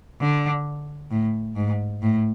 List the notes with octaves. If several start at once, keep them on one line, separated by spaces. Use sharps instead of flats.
D3
A2
G#2
A2